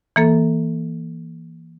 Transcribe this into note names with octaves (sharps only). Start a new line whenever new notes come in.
E3 A#3 A4